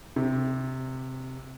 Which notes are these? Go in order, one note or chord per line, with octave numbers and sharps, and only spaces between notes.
C3